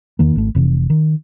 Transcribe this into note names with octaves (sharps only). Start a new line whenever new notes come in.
E2 D#3 A#3
G#1 A3
F1 C3 E3
D#3